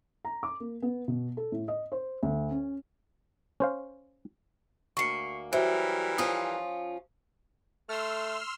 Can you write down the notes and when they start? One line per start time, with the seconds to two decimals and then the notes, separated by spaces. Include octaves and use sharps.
0.25 A#5
0.43 D6
0.60 A#3
0.82 B3
1.08 B2
1.37 A4
1.52 A2
1.68 D#5
1.92 C5
2.23 D2
2.51 C#4
3.60 C#4 C5 F5
4.97 D2 A#3 C#6 C7 C#7
5.53 E3 F#3 G3 A#4 C5 E5
6.18 F3 C#4 F4 D#6
7.89 A3 C6 E6 F6